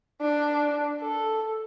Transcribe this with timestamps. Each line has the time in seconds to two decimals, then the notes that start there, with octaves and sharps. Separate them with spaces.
0.21 D4
1.01 A4